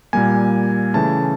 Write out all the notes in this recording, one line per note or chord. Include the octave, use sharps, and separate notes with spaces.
A#2 G3 A#3 G#5
C#3 E3 A3 A5